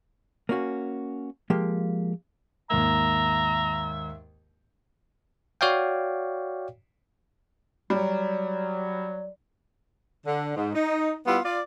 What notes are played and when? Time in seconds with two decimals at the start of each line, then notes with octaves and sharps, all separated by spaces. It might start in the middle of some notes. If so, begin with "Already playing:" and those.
0.49 A#3 C#4 F#4
1.50 F3 G#3 A#3 G4
2.70 D#2 G#2 A#3 E5 A#5
5.61 F#4 C#5 D5 F5 G5
7.90 F#3 G3 D5
10.26 D3
10.56 G#2
10.75 D#4
11.27 G3 B3 E4 F4
11.45 F4 D5